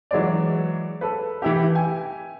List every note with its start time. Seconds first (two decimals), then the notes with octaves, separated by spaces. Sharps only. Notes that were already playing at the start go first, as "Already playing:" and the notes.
0.11 E3 F#3 G#3 C#5 D5
1.01 A4 B4
1.42 E3 E4 G4
1.75 G5 G#5